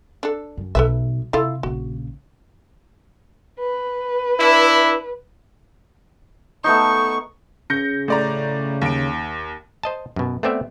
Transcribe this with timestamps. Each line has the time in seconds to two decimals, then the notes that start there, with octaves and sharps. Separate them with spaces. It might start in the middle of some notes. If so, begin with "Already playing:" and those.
0.23 D4 A4
0.57 F#2
0.75 B1 A4 B4 E5
1.33 C3 E4 F4 A4
1.63 A#1 C#3 F#4
3.60 B4
4.40 D4 E4
6.64 A3 B3 D#4 C#6
7.70 C#3 G6 A#6 C#7
8.08 A2 C#3 D5 A#5
8.82 D#2 D7
9.83 C5 D#5 A5
10.16 F#2 B2
10.43 A3 B3 C4 D5 E5